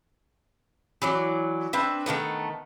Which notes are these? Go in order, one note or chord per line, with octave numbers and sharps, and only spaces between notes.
E3 F#3 D5
C4 D4 B4 E5
D#3 G3 A3 B3